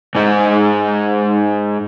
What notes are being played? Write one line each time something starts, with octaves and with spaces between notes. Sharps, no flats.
G#2 D#4